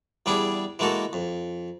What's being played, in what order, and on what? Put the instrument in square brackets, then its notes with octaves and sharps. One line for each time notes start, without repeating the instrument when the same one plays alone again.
[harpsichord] E2 G3 D4 E4 G#4
E3 G#3 A#3 F#4 A4
F2